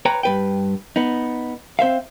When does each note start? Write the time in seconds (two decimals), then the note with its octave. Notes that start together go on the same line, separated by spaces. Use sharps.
0.05 B4 C#5 G5 A#5
0.23 G2 B4 G5
0.96 B3 D#4
1.79 C4 C5 E5 F5